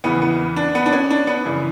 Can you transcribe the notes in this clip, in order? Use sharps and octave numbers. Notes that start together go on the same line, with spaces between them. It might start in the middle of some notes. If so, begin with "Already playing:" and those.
E2 C#3 E3 B3
B3
D4
B3
D4
C#4
D4
B3
F#2 C#3 E3